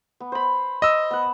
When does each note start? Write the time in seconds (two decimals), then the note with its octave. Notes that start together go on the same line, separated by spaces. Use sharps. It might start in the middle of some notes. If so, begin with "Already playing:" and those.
0.20 B3
0.32 C5 B5
0.82 D#5 E6
1.11 B3 F#5